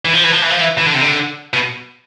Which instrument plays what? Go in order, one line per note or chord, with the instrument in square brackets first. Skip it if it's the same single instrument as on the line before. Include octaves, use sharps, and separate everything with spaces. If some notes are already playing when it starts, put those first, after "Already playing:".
[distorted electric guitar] E3
F3
E3
F3
E3
F3
E3
E3
D3
C3
D3
B2